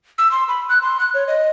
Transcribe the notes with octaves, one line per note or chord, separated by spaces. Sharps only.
E6
C6
B5
F#6
C6
F#6
C#5
D#5